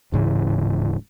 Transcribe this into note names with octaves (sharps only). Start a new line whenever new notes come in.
D1 G#2 C#3 E3